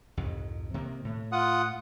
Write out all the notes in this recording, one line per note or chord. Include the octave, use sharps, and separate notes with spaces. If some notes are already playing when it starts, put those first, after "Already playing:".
C2 F2 G#2
C3 D#3 A#3
A2
F4 F#5 D#6